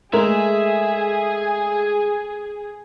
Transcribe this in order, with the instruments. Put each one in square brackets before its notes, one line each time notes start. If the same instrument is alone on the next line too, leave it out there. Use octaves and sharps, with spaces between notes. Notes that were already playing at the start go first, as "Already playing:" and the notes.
[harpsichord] G#3 [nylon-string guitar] A3 A#4 [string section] G#4 [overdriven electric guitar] E5